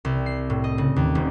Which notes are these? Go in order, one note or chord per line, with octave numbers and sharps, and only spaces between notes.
C2
C7
A2
D#5
C#3
D#2
D#1